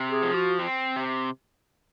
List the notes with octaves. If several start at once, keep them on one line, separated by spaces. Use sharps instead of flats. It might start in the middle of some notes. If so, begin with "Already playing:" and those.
Already playing: C3
G#4
F3
F#4
C4
C3